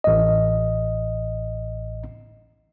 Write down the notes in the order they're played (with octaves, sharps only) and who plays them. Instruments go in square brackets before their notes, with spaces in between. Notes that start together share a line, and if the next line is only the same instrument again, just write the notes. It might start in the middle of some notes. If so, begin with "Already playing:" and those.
[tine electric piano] A1 D#5